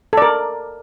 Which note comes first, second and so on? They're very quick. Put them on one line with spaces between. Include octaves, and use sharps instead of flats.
A4 D5 A#4